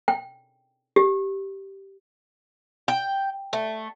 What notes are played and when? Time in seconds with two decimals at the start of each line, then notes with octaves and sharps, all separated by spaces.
0.08 G5
0.96 G4
2.88 G5
3.53 A3